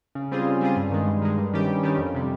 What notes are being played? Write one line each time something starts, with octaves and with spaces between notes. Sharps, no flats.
C#3
G3 C4 F4 G#4
C#3
G3 C4 F4 G#4
G2
D#3 G#3
G2
D#3 G#3
G2
D#3 G3 C#4 G4
G2
D#3 G3 C#4 G4
F2
C3 G3